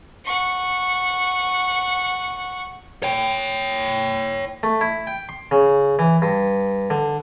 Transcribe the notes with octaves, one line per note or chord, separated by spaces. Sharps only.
F#5 C#6
C#5 G5
A3
E4
G5
C6
C#3
E3
G2
D3